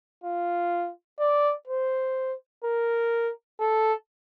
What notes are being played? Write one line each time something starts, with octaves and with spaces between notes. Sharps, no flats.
F4
D5
C5
A#4
A4